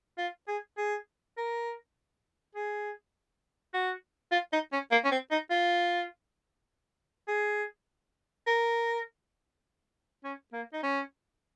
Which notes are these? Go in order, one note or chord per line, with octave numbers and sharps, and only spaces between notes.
F4
G#4
G#4
A#4
G#4
F#4
F4
D#4
C#4
A#3
C#4
C4
D#4
F4
G#4
A#4
C#4
A#3
D#4
C#4